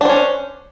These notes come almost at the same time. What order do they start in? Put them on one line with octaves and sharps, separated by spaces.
D4 C5 C#4